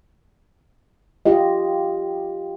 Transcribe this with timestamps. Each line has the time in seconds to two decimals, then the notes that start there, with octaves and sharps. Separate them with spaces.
1.25 F4 G4 D#5